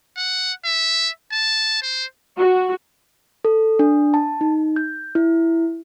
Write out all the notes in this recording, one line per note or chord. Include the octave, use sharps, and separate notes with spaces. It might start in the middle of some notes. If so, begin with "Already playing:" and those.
F#5
E5
A5
C5
F#4
A4
D4
A5
D#4
G6
E4